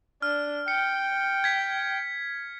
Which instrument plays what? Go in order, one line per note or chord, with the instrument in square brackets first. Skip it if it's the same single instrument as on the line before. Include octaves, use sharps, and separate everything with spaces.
[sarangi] D4 [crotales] F6
[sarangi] G5 [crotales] C#7
[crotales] G#6 B6